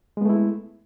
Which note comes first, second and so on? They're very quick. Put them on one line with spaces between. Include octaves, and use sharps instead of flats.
G#3 B3 A3 E4